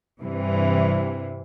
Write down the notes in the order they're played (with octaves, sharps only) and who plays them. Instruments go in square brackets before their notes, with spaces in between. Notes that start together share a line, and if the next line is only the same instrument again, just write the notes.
[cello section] G2 C3 E3